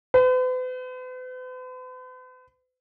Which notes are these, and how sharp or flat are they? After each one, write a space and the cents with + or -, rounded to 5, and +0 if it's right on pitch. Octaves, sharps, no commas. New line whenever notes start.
B4 +45